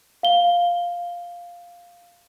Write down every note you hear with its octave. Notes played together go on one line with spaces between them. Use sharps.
F5 G7